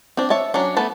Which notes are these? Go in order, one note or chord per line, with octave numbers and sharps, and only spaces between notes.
C4 D4
C#5 E5 A5
F#3 C#4 D4
A3 B3 A4 A5